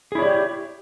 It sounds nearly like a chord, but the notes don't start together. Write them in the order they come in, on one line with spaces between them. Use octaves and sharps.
G#4 E4 C#5 D5 G4